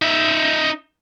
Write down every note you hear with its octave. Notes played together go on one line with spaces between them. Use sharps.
D#4 E5